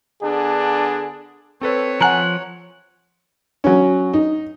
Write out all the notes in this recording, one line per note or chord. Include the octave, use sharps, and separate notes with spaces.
D3 B3 D4 G#4
C4 A4 B4 C#5
F3 F#5 G#5 A#5 F#6
F#3 C#4
D#4